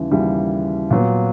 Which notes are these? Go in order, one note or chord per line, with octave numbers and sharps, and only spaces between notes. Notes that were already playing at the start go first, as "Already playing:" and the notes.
Already playing: D#2 C#3 E3 G3
D#2 C#3 E3 G3
A#2 F#3 B3